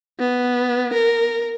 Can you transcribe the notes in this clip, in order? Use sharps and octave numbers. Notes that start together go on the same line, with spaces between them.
B3
A#4